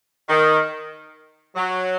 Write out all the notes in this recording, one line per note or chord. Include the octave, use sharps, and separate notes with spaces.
D#3
F#3